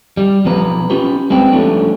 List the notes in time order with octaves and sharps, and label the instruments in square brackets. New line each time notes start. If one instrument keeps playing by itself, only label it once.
[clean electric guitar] G3
B1 F3 B3 B4 A#5
C#4 F4 G4 B4
G3 G#3 C4 B4 G5
F3 G3 A3 C#4 D4 F4